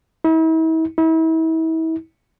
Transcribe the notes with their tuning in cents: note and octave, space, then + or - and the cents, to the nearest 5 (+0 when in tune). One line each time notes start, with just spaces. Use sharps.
E4 -40
E4 -35